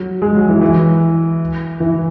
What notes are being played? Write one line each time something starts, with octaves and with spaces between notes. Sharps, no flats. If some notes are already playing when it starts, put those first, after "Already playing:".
Already playing: F#3
G#3
F#3
E3
E3
E3